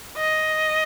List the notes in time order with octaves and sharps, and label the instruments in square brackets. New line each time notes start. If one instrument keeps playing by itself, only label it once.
[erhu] D#5